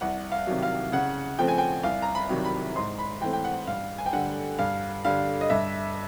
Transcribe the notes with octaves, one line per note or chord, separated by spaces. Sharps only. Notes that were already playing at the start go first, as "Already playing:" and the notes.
C2 F#5
F5
C3 D#3 F#3
F5
C#3 F#5
F3 A3 C4 G5
G#5
G5
C2 F5
A#5
B5
C3 D#3 F#3
B5
G#2 C6
B5
E3 A3 C4 G5
G5
F#5
G2 F5
G#5
G5
D3 G3 F#5
G2 F5
D3 G3 F5
D#5
G2 E5